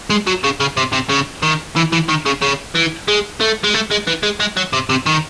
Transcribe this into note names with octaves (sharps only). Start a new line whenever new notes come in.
G#3
F#3
C#3
C#3
C3
C3
C#3
D#3
E3
E3
D#3
C#3
C#3
E3
G#3
A3
G#3
A3
G#3
E3
G#3
G#3
F#3
C3
C3
D#3